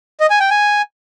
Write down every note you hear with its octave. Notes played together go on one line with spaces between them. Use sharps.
D#5
G#5
G5
G#5